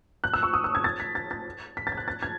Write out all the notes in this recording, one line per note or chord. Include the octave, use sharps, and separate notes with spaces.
F#6
E6
C#6
D#6
E6
G#6
A6
B6
A6
A6
B6
A6
G#6
F#6
A6
G#6